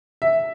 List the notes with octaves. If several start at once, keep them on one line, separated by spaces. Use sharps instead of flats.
E5